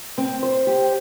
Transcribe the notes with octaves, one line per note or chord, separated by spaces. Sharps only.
C4
C5
G4